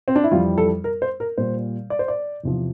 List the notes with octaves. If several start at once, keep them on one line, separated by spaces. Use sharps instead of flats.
C4
D4
E4
F2 E3 G3 F4
A4
A#4
C5
A#4
A#2 G3 C5
D5
C5
D5
E2 C3 F3